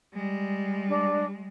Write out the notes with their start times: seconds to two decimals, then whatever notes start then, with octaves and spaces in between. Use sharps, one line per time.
0.14 G3 G#3
0.88 D4